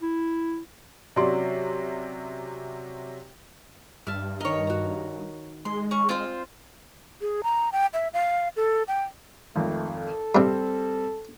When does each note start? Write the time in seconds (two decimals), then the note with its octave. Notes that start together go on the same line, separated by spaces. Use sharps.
0.02 E4
1.16 C3 F#3 C#4 D5 C6
4.07 G2 E5 A5 F6
4.41 D#3 A#4 C#5 D#5
4.67 F#4 A#5
5.65 G#3 C6
5.91 C#4 C#6
6.09 C4 F4 C5 D5
7.21 G#4
7.44 A#5
7.72 G5
7.94 E5
8.14 F5
8.56 A4
8.88 G5
9.56 G#1 F2 A3
9.95 A4
10.35 G2 C3 G3 C4